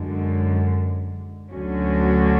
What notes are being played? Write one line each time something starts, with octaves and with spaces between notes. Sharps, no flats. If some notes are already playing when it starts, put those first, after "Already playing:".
Already playing: F#2 D3 G#3
D2 D3 F#3 C#4 F#4